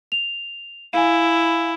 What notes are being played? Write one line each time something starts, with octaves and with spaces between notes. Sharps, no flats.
F7
E4 F5 G#5